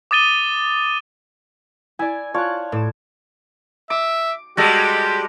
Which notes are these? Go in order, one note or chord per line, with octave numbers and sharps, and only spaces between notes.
D6 D#6 A6 D#7 G7
E4 D5 G#5
F4 C#5 D5 A5 F#6
A2 D6 E7
E5 D6
G3 G#3 F#4 G4 A4 D#5